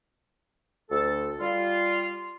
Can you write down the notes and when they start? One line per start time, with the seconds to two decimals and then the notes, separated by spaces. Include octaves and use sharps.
0.90 D2 A4
1.40 G3 F4